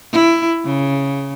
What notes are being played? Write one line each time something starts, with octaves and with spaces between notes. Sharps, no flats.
E4
C#3